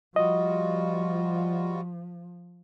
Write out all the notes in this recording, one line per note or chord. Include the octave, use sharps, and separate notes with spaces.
F3 G3 F4 F#4 D#5